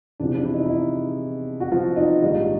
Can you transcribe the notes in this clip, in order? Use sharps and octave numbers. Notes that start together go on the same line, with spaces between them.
E2 C3 F3 D4
D4
E4
D#4
E4
D#4
F#4
F3 F4
D#4
A#1 G#2 D#3 G3 D#4